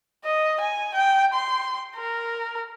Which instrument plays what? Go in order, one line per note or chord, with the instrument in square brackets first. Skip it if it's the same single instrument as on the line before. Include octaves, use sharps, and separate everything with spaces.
[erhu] D#5
G#5
G5
C6
A#4